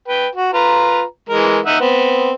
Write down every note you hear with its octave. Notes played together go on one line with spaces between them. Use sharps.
B4 G5
F#4
F4 B4 A#5
E3 G#3 A#4
D#4 E5 F#5
B3 C4